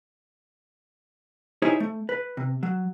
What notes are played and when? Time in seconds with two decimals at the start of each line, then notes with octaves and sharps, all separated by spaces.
1.62 D#4 E4 G4 G#4 C5 C#5
1.80 A3
2.09 B4
2.37 C3
2.63 F#3